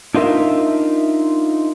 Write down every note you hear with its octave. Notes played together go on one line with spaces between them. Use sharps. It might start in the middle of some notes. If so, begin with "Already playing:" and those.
D4 D#4 F4 A#4 E5